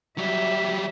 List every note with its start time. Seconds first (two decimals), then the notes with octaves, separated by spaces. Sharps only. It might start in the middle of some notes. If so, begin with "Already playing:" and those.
0.18 F#3 G3 E5